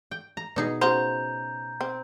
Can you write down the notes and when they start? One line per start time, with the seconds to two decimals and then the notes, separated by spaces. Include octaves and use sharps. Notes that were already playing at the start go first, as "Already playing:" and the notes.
0.11 G5
0.37 A#5
0.56 B2 D#4 G#4
0.81 C#3 F#4 C5 A#5 G6
1.81 C4